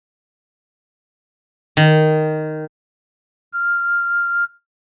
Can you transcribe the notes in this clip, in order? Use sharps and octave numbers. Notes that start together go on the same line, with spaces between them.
D#3
F6